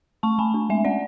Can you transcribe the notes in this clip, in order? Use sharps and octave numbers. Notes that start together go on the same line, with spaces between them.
A3 A5 C#6
A3 G#5 B5
D4
G#3 E5 G#5
C#4 D5 F#5